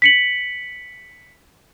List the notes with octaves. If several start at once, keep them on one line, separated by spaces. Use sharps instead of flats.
B6 C#7 F#7